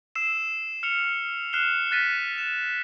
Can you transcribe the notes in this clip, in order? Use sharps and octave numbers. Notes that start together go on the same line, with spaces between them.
E6 C7 E7
F6 C#7 F7
F6 F#6 C7 E7 G7
F#6 A6 B6 D#7
E7